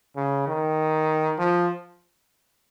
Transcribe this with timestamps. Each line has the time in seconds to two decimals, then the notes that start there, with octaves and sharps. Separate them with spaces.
0.16 C#3
0.47 D#3
1.39 F3